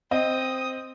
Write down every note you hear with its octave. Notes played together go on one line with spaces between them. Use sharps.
C4 D#5 G5 D#6